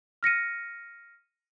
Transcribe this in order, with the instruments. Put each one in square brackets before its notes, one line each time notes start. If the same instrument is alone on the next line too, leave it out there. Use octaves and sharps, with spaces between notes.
[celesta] F6 A#6 C#7 D#7